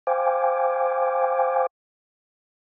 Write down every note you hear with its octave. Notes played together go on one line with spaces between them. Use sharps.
C5 F5 G5 G#5 D6